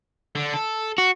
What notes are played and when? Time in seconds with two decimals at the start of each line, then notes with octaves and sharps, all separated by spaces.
0.36 D3
0.54 A4
0.98 F#4